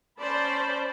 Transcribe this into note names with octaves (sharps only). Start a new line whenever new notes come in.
C#4 C5 D5 A5 B5